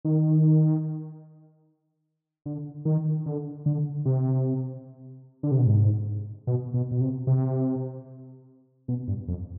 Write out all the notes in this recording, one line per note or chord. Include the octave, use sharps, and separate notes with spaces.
D#3
D3
D#3
D3
D3
C3
D3
C3
B2
G#2
B2
B2
B2
C3
C3
B2
G2
F2